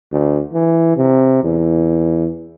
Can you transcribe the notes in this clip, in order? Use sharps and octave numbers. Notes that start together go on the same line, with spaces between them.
D2
E3
C3
E2